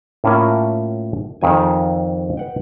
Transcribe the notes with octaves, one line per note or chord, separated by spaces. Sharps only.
A2 A#3 C#4 E4 F4 A#4
F2 D#3 G#5
B4 F#5 G5